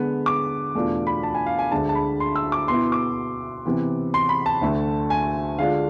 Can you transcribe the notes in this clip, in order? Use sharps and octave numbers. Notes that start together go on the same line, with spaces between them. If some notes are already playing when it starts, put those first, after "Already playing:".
Already playing: D3 G#3 B3
D6
E2 B2 A3 D4 F4
B5
A5
G#5
F5
G#5
D2 D3 G#3 D4 A5
A5
B5
C6
E6
D6
B2 B3 E4 C6
D6
C3 E3 B3
C6
B5
A5
D2 D3 A3
G#5
D3 G#3 D4 F4 F5